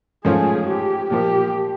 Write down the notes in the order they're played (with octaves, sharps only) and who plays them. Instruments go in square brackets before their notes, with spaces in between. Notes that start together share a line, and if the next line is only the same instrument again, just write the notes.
[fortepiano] G#2 F3 A3 C#4 F4 [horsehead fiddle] G#4
[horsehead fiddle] G4
[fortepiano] A#2 F3 A#3 [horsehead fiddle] G4